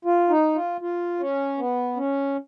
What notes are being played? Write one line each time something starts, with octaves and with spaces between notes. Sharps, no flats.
F4
D#4
F4
F4
C#4
B3
C#4